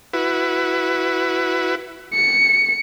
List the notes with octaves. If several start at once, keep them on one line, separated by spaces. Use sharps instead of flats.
E4 F#4 B4
C#7